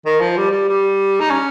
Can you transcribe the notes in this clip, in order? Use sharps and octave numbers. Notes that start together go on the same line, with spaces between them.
D#3
F3
G3
G3
G3
D#4
C#4